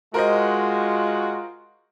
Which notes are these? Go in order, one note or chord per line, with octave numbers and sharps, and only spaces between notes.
G#3 F4 F#4 A#4 C5 D#5